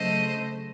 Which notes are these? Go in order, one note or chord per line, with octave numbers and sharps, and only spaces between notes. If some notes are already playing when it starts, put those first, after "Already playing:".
Already playing: C#3 F#3 A3 C5 D#5